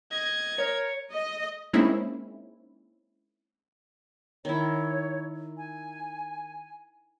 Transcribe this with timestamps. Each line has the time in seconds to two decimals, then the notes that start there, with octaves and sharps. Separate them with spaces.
0.11 D#5 G#6
0.58 A#4 C#5
1.12 D#5
1.73 G#3 A#3 C4 C#4 D#4 E4
4.45 D#3 E4 C#5
5.57 G#5